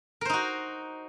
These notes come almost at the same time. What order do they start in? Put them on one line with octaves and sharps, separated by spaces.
A#4 C5 D#4 F#4